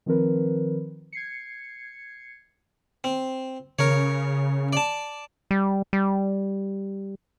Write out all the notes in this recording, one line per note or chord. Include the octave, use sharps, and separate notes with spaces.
D#3 F3 C4 A#4 B4
G#6 C7 C#7
C4
C#3 A#4 C#5
D5 A5
G3
G3